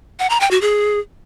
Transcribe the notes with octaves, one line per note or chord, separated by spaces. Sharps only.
F#5
A#5
G5
F#4
G#4